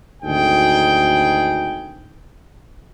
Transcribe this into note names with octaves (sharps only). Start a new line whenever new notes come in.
G#1 D2 D#4 G#4 G5